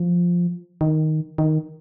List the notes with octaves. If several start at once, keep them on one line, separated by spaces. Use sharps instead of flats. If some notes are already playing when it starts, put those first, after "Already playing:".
Already playing: F3
D#3
D#3